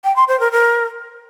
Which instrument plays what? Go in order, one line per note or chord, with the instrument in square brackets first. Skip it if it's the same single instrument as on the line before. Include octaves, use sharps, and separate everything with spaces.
[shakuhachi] G5
C6
C5
A#4
A#4